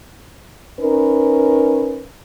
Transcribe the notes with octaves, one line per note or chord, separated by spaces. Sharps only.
C#4 D#4 A#4 B4